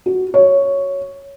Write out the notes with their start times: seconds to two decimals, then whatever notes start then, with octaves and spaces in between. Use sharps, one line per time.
0.06 F#4
0.34 C#5